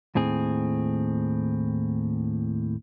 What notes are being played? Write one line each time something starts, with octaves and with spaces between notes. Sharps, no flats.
D#2 A2 C4 G#4